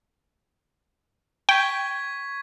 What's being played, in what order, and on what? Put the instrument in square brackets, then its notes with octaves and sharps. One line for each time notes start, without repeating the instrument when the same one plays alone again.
[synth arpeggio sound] G5 [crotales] C#6 G#6 B6